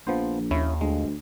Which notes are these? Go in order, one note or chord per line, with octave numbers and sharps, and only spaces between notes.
A#1 F3 B3 C5
D#2 C#4 E4
D2 G#3